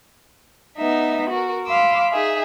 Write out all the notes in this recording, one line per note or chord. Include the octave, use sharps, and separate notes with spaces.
B3 D#4 E5
F#4 A#4
F5 B5 C6 D6 E6
D#4 G#4 E5